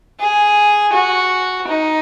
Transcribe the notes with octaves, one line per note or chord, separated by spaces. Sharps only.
G#4
F#4
D#4